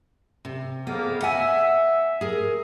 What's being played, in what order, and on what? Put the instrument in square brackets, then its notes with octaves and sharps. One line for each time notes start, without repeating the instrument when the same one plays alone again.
[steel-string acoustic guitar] C3
[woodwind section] F2 C#3 A#3 [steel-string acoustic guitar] B3
[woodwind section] E5 [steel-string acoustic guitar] F#5 G#5
[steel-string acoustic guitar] G#4 A#4